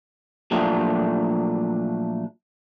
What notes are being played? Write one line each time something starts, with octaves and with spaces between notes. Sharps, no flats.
A#2 F3 F#3 A3 D4